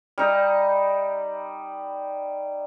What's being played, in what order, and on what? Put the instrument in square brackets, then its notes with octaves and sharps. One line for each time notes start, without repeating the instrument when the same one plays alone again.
[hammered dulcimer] G3 D#4